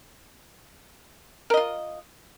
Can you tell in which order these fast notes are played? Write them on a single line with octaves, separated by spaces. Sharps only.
A#4 D#5 F4